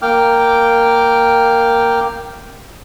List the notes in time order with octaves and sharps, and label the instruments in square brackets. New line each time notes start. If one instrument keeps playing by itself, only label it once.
[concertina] A#3 G5 D6 F6